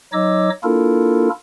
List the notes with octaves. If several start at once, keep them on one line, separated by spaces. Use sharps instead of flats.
F#3 D#4 C#5 D#5 D6 E6
A#3 D4 E4 F4 A4 A#4